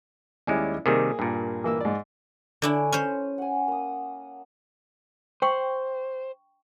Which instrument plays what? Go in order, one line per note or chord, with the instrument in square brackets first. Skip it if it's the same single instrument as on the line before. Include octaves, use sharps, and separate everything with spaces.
[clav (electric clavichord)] D#2 G3 G#3 [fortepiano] C#4 E4 D5
[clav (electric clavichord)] C3 D#3 G3 [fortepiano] A#3 G#4
[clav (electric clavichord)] G2 A#2
[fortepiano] E3 A#3 E6
G#2 D5
[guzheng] D3 D4 E4 [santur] A4 C#5 G#5
[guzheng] C#4 C5
[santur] F#5 G#5
A#3 D#6
[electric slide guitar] C5 [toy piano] G5 C#6